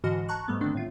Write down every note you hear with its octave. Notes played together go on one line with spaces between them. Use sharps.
G#2 D3 E3 F#4 D#5 F6
A5 A#5 C#6 F#6
G#2 G3 A3 B3
D3 D#3 A3 B3 C4 D4
A2 F4